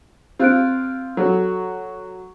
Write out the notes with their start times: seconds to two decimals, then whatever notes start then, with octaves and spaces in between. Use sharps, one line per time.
0.39 C4 F4 G4 F#6 D7
1.17 F#3 A4